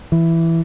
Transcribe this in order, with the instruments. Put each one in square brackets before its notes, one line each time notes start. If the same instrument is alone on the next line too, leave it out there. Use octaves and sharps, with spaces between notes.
[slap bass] E3